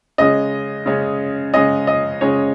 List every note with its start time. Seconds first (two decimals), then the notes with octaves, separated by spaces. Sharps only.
0.18 C#3 G#3 C#4 D#5
0.86 C#3 G#3 C#4
1.54 C#3 G#3 C#4 D#5
1.87 D#5
2.21 C#3 G#3 C#4 C#5